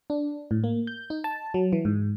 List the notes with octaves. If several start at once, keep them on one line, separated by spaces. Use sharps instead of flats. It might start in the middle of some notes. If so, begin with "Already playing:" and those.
D4
A2
A#3
G6
D#4
A5
F#3
E3
G#2